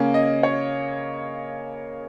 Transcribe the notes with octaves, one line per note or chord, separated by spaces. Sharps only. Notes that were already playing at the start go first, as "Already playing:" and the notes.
Already playing: C#3 A#3 C#4
D#5
C#5